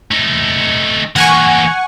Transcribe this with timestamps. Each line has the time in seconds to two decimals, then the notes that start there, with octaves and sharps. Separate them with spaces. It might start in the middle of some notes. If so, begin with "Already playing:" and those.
0.11 A3 D#4
1.16 E3 A#3 F#5 G#5 C#6